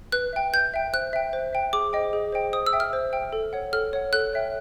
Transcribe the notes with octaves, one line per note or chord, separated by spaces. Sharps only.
B4 F#6
E5 G5
B4 G6
E5 G5
C5 F#6
E5 G5
C5
E5 G5
G#4 D6
C5 D#5 G5
G#4
C5 D#5 G5
C5 D#6
E6
E5 G5
F6
C5
E5 G5
A4
C#5 F#5
A4 F6
C#5 F#5
A4 F#6
C#5 E5 G5